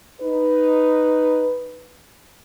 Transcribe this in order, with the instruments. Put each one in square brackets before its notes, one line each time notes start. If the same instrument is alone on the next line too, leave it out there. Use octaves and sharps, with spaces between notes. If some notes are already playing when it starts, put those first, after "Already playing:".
[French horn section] D#4 B4